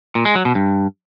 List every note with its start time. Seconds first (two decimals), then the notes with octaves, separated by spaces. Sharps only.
0.15 A#2
0.25 G#3
0.35 F#3
0.45 B2
0.55 G2